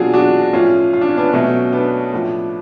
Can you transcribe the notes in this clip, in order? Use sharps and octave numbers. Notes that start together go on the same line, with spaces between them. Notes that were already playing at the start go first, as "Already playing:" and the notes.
Already playing: B2 F#3 D4 F4 F#4 G#4
D4 F#4
A2 F3 C#4 F4
F4
D4
C#4
B3 D4
B2 F#3 A3 C#4
B3 D4
A2 F3